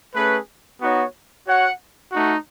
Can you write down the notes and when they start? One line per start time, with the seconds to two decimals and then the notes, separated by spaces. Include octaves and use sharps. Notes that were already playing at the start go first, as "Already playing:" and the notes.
0.14 A3 C#4 G#4 B4
0.80 B3 D#4 F#4 C#5
1.46 F#4 C#5 F#5
2.12 A3 D#4 F#4